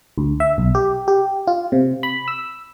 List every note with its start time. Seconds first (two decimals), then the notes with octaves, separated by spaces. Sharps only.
0.18 D2
0.40 E5
0.58 B1
0.75 G4
1.08 G4
1.47 F4
1.72 C3
2.03 B5
2.28 E6